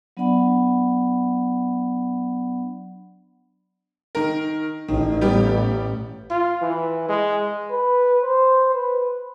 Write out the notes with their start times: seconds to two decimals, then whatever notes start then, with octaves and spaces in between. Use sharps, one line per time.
0.17 F#3 B3 D4 D5 F#5 B5
4.15 D#3 A#4
4.88 A1 D#3
5.21 G3 B3 G4
6.31 F4
6.62 E3
7.09 G#3
7.71 B4
8.23 C5
8.75 B4